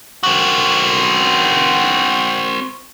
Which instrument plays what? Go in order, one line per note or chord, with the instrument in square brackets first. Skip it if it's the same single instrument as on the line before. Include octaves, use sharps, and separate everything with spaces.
[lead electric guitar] C4 F#4